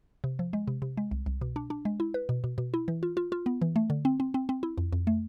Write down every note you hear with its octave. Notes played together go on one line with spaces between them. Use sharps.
C3
F3
G#3
C3
C3
G#3
C2
C2
B2
D4
D4
G#3
E4
B4
B2
B2
B2
E4
E3
F4
F4
F4
B3
E3
A3
D3
C4
C4
C4
C4
E4
F2
F2
A3